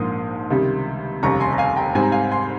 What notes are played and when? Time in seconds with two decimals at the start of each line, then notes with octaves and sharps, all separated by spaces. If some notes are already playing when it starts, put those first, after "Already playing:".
Already playing: A#1 G#2 F3 A#3 C6 D#6
0.50 C#2 C3 D#3 G3
1.23 F1 D#2 C#3 G3 A#5 C#6
1.40 G#5 C6
1.53 A#5
1.58 F5 G#5
1.76 G5 A#5
1.95 G#2 G3 C4 G#5
2.03 A#5
2.12 F5 G#5
2.31 G#5 C6